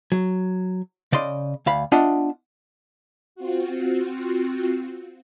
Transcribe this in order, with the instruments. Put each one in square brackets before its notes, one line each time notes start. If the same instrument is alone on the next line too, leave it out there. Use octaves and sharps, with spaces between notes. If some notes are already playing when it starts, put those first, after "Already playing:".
[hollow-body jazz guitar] F#3
C#3 D5 D#5 C6
D2 F5 B5
B3 D4 F4 D#5 E5 F#5
[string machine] C4 F4 F#4